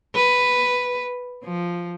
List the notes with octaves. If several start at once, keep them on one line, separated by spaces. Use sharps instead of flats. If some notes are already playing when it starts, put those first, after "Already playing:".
B4
F3